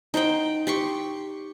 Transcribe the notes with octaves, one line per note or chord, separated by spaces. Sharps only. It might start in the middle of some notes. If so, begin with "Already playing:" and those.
D#4 C5 F#5 G5
G4 C6 C#6